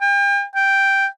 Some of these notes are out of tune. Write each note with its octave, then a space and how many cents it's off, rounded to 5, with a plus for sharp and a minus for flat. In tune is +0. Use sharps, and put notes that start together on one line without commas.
G5 +40
G5 +0